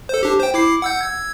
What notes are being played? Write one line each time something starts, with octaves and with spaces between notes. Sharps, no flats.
A4 C5
D4 G4
C5 G5
E4 D6 C7
F#5 E6 G6
E6 G#6